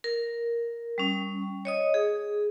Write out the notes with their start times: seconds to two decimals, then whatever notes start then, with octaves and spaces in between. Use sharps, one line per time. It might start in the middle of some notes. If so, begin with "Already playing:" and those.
0.04 A#4
0.98 G3 C#4
1.65 C#5 D#5 D#6
1.94 G#4